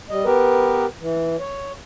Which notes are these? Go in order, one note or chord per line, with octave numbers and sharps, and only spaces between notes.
G3 D#5
B3 G4 A#4 B4
E3
C#5